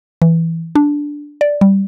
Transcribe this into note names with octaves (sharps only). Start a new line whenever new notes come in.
E3
D4
D5
G3